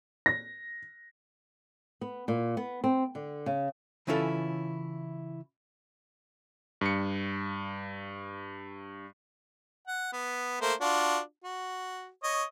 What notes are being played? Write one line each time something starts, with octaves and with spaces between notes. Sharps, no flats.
A#6
B3
A#2
B3
C4
D3
C#3
C#3 E3 C#4 E4 F4 A4
G2 C#7
F#5
B3
A3 A#3 C5
D4 F4 F#4
F#4
C#5 D#5